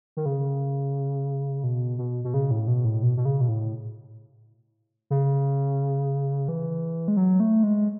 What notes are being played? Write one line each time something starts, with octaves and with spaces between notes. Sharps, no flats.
D#3
C#3
B2
B2
B2
C#3
A2
B2
A2
B2
B2
C#3
B2
A2
C#3
E3
G#3
F#3
A3
G#3